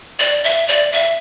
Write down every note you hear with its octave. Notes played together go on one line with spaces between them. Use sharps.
D5
E5
D5
E5